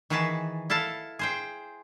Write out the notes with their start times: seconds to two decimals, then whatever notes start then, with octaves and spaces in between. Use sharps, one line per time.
0.10 D#3 E3 F#4 G#4 B4 A5
0.70 E4 A4 F5 A5
1.19 G#4 C5 G5